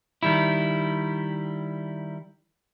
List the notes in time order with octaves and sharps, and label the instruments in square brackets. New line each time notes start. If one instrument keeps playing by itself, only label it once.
[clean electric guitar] D#3 G3 E4